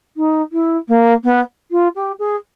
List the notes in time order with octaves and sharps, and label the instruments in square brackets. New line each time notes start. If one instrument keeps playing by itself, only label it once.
[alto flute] D#4
E4
A#3
B3
F4
G4
G#4